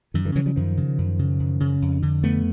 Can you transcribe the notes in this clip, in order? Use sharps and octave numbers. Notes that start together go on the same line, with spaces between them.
F#2 D#3
D3 E3
C#3 E3 F#3
F3 G3
F#2 D#3 F3
C#3
F#2
C#3
F#2
C#3
F2
D3
F2 A3 B3